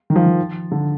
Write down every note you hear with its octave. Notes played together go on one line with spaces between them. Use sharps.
D#3
F3
D#3
D3